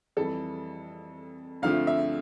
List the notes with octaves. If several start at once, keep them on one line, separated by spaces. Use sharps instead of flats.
F2 E3 G3 A4
D2 D3 F3 A3 C4 F5
E5